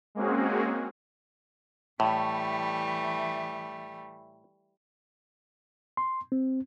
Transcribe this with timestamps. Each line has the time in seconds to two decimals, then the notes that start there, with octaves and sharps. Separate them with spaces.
0.15 G#3 A#3 C4 C#4 F#4 G#4
2.00 A2 E3 G3 A3
5.97 C6
6.32 C4